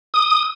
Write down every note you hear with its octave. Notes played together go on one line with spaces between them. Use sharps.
D#6